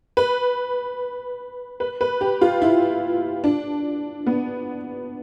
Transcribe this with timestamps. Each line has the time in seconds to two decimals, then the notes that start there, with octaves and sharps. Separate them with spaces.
0.17 B4
1.80 B4
2.01 B4
2.21 G4
2.41 F4
2.62 E4
3.44 D4
4.26 B3